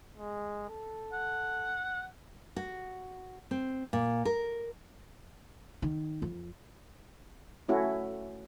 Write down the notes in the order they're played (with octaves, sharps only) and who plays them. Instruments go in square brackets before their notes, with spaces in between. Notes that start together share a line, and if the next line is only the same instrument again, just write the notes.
[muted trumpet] G#3
A4
[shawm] F#5
[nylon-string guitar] F#4
C4
A#2
A#4
[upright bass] D#3
F2
[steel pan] A3 C#4 E4 F#4